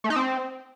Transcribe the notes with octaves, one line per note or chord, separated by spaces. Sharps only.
A3
D#4
C4